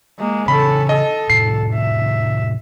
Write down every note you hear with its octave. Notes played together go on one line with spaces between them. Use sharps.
G#3 A#3
C#3 E3 C#4 A4 B5
A4 D#5
A2 C3 D#3 C7
E5